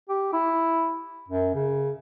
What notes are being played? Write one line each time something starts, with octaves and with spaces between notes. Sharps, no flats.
G4
E4
F#2
C#3